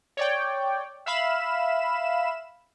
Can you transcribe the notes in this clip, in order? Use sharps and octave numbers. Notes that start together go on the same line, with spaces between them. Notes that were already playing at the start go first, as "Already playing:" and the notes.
C#5 D5 G5
E5 F5 B5 E7